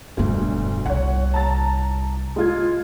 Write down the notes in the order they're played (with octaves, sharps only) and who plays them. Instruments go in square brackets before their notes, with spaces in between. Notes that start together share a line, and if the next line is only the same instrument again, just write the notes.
[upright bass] E1 G2 [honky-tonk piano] D2 B2
[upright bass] C2 [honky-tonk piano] C#5 F#5
[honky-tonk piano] A5 A#5 A6
G#3 F4 G#6